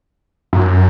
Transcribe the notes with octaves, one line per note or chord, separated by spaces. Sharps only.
F#2